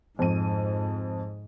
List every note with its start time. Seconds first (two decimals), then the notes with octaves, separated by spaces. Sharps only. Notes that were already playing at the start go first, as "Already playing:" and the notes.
0.19 F2 G#2 D#7